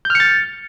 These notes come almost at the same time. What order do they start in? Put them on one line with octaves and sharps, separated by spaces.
G6 F6 C#7 A6